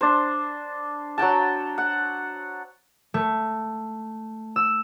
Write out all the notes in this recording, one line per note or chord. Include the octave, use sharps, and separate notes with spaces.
D4 C5
F#3 F#5 G5 A5
F#5
A3
E6